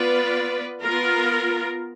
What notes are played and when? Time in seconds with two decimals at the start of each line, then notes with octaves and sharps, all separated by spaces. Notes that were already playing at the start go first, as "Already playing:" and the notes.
Already playing: B3 F4 B4 D5
0.81 B3 F4 A#4